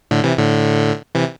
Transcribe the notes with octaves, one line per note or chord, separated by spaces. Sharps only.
A2 D3
C3 E3
A2 D3
C3 E3